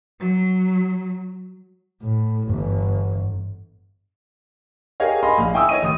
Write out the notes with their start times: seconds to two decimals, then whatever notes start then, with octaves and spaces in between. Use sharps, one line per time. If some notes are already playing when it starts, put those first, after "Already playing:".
0.20 F#3
2.02 A2
2.49 G1 G2 E3
5.00 G4 G#4 A#4 C#5 D#5 F5
5.23 D#5 F5 G#5 B5 C6
5.38 A#1 F5
5.54 E4 G5 G#5 C#6 D#6 E6
5.69 C#5 D#5 D#7
5.83 A1 D#6